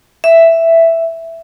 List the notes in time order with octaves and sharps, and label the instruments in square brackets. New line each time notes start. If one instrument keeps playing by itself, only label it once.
[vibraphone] E5